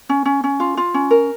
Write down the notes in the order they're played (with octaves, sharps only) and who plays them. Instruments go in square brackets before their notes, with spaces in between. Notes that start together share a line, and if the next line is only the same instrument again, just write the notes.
[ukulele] C#4
C#4
C#4
F4
F4
C#4
A#4